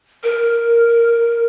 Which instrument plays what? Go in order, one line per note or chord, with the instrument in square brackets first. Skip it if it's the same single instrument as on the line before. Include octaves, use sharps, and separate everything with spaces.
[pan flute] A#4